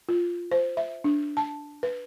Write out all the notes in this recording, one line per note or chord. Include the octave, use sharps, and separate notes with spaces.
F4
C5
E5
D4
A5
B4